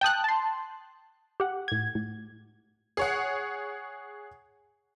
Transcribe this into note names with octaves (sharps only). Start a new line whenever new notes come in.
G5 A5 D#6 F#6
A5 C6
G4 F#5
A2 G#6
A2
G#4 C#5 F#5